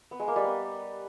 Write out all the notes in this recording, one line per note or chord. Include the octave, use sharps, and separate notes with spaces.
B3
G#3
A#3
G3
B3